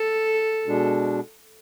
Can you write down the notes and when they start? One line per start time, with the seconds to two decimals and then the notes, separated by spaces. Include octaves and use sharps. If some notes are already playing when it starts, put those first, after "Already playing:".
Already playing: A4
0.66 B2 G#3 D4